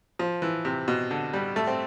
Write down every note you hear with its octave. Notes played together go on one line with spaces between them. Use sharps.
F3
E3
C3
B2
D3
G3
A3
C4